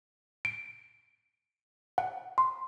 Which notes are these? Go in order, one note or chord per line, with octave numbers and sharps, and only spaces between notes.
D7
F#5
C6